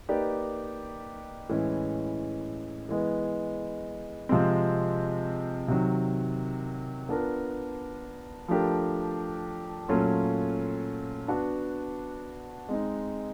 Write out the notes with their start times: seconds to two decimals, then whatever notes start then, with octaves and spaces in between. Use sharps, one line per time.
0.09 A#3 D#4 G4 B4 D5
1.49 A2 E3 G#3 C#4
2.89 E3 G#3 B3
4.29 C3 F3 G#3 C4
5.68 C3 D#3 F#3
7.09 B3 D4 F4 A#4
8.48 F3 A3 D4 G4 A#4
9.89 A#2 F#3 A3 C#4 F4
11.28 B3 D4 F#4
12.69 G#3 C4 D#4